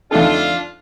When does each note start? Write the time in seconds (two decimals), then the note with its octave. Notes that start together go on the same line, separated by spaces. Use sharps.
0.11 F2 D3 A3 D4 D#4 F4 A4